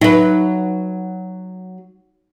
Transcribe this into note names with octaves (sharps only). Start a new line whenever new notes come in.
F#3 D#4 B4 E5